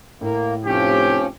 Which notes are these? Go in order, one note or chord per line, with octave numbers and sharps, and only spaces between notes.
A2 A#3
F1 F3 C#4 G4